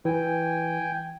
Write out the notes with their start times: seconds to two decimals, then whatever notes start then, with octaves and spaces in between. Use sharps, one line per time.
0.05 E3 G5 G#5